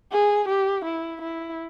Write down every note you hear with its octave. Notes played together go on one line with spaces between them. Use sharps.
G#4
G4
E4
E4